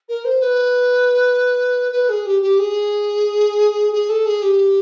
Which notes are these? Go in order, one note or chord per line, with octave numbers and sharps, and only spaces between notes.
A#4
C5
B4
B4
G#4
G4
G4
G#4
G#4
A4
G#4
G4